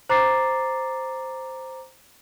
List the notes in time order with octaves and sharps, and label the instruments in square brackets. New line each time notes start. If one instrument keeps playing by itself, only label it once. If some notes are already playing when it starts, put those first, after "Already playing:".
[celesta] C5 A#5 D6 A6 C7